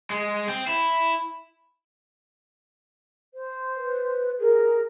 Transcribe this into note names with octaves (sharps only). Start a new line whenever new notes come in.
G#3
C4
E4
C5
B4
G#4 A#4